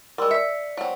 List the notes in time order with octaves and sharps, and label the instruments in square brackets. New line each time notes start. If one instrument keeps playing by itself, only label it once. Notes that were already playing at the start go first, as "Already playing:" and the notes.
[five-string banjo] G3 G#3 [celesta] A#4 C6 E6
[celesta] D5 B6 C#7 [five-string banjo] E5
[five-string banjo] F#3 C4